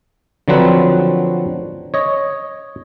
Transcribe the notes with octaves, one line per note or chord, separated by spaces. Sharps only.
D3 F3 F#3 C4 B4
C#5 D#5